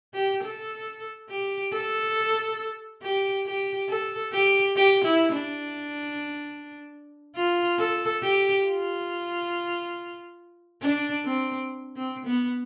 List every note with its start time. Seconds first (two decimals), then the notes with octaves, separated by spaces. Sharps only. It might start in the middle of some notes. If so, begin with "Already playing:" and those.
0.14 G4
0.43 A4
1.30 G4
1.72 A4
3.02 G4
3.46 G4
3.89 A4
4.33 G4
4.76 G4
5.04 E4
5.33 D4
7.35 F4
7.79 A4
8.22 G4
8.65 F4
10.82 D4
11.25 C4
11.96 C4
12.26 B3